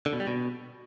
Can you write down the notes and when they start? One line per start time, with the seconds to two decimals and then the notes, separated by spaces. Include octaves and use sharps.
0.06 D3
0.13 B2
0.20 G3
0.27 B2